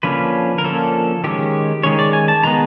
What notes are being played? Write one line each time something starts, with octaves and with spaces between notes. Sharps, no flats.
D3 F3 A#3 C#4 B4
A#4
D3 F3 A#3 C#4 A4
D#3 G#3 C#4 G4
D#3 G#3 C#4 C#5
D5
G#5
A5
D#3 G#3 B3 A#5